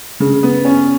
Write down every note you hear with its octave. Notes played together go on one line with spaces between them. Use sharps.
C#3
B3
C#4